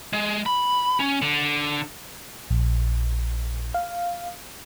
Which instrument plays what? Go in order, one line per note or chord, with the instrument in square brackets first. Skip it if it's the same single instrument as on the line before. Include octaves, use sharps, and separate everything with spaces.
[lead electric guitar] G#3
B5
C#4
D3
[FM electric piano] A#1
F5